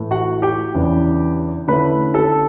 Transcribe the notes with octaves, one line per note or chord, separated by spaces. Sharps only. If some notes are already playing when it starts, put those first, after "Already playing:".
Already playing: A2 E3 A3
F#4 F#5
G4 G5
E2 C#3 E3 B3 D4
D3 A3 C#4 E4 B4 B5
A4 A5